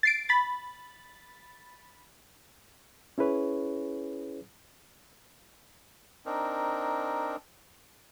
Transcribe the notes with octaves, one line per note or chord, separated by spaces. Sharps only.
A6 C7 D7
B5 A6
C#4 E4 G#4 B4 C#5
C4 D4 D#4 A#4